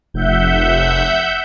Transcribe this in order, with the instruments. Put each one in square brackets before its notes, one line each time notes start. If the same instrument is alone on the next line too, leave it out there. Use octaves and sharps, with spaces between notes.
[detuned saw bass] F1 [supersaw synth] E5 F#5 G6